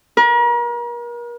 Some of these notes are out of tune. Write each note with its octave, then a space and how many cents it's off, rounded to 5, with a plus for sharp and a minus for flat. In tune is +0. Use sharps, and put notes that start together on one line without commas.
A#4 +40